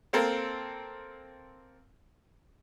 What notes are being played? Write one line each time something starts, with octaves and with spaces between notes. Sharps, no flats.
A#3 C4 A4 A#4